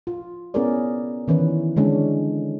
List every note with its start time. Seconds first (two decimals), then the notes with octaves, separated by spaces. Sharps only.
0.07 F4
0.54 B3 C#4 E4 G#4 A#4 D5
1.28 D#3 E3 C#4 B4
1.76 D3 G#3 C#4 D4